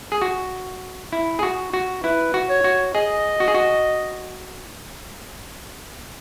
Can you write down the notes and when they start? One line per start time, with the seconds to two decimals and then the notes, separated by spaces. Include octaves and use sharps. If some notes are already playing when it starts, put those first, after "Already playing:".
0.12 G#4
0.22 F#4
1.13 E4
1.39 G#4
1.43 F#4
1.73 F#4
2.04 E4 B4
2.34 F#4
2.49 C#5
2.64 F#4
2.95 G#4 D#5
3.40 F#4
3.48 G#4
3.54 F#4